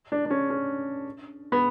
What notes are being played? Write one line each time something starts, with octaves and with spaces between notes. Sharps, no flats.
D4
D4
C#4
C#4
B3